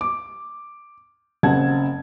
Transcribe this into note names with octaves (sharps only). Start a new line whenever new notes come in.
D6
F#1 C#3 C4 F#5 A5 G#6